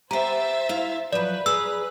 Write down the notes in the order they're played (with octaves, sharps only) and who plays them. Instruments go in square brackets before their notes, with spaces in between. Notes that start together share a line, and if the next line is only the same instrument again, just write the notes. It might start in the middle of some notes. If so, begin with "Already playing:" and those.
[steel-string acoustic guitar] B3 G4 [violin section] C5 E5 A6 [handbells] A#5
[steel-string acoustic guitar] E4 F5
[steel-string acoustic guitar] F3 F#3 [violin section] B4 [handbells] D5
[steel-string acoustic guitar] G#4 A#5 [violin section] B4 [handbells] E6